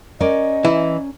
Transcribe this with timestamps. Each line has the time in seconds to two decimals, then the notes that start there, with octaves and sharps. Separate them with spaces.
0.20 C#4 A#4 D5 D#5
0.65 E3 E4